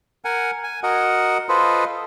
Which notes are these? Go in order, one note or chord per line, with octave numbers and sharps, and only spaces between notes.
A#4 F#5 G#5
G#5
F#4 A#4 D#5 F#5
F4 A4 B4 C5 D#5